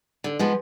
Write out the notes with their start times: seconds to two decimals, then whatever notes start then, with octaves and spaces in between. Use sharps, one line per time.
0.24 D3
0.39 F3 G#3 B3